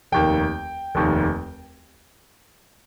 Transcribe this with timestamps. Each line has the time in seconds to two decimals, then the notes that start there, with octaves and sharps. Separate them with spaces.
0.12 F1 D#2 D#3 G5
0.95 F1 D#2 D#3